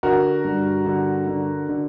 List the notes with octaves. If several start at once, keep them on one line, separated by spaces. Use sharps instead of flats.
D3 F#4 A#4
G2
D3
D3
D3